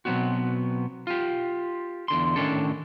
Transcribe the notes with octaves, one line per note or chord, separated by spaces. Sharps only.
B2 F#3 A3 B3 C4 F#4
F4 G4
E2 D3 C6
A2 D#3 C#4 D4 A4